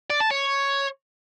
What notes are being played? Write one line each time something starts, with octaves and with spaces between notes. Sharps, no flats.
D5
A5
C#5